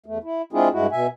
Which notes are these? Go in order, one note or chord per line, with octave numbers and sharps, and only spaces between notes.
E2 A3
E4
G#3 C4 D4 E4 F4 G#4
G2 G#3 E4 F#4
B2 E5 G#5